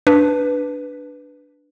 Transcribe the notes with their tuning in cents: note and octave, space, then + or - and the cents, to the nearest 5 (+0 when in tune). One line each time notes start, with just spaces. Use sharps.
D4 +0 B4 +0